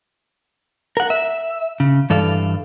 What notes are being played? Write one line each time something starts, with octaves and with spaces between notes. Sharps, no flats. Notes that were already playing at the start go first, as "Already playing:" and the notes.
A#4 F#5
E5
C#3
G2 E3 A4 D5 F5